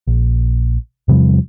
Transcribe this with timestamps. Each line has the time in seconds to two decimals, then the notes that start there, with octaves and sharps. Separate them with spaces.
0.07 A#1
1.08 E2 C3 F3 G3